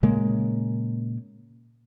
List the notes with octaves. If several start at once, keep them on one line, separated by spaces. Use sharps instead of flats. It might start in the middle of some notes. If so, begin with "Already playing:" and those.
A#2 C#3 G#3 A#3